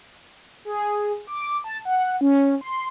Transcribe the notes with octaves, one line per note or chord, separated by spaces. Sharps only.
G#4
D6
A5
F#5
C#4
C6